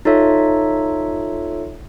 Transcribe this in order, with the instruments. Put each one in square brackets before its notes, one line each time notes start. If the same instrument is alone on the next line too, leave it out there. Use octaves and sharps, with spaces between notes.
[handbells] D#4 F4 A4 C#5 E5